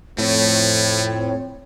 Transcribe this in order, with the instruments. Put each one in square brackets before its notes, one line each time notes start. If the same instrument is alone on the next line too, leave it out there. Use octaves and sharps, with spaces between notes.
[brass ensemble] F2 C4 [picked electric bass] A2 [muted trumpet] A3 [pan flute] C#5